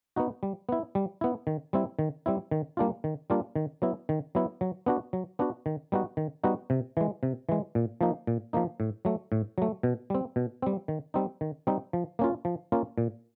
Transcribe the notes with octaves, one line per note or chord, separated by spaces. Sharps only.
B3 D#4 F#4
G3
B3 E4
G3
B3 E4
D#3
G3 C4 E4
D#3
G3 C4 E4
D#3
G3 A#3 D4 F4
D#3
G3 A#3 D4 F4
D#3
F#3 B3 E4
D#3
F#3 B3 E4
F#3
B3 D4 F#4
F#3
B3 D4 F#4
D#3
G3 B3 D#4 F#4
D#3
G3 B3 D#4 F#4
C3
E3 G#3
C3
E3 G#3
A#2
F3 A#3 D#4
A#2
F3 A#3 D#4
A2
F#3 A3
A2
F#3 A3
B2
G3 C4
B2
G3 C4
D#3
G3 C4 D#4
D#3
G3 C4 D#4
F3
A#3 C#4 F4
F3
A#3 C#4 F4
A#2